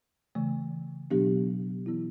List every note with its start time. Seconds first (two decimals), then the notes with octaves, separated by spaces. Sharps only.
0.35 C#3 E3 A3
1.11 B2 F#3 B3 D4 G4
1.86 E3 B3 E4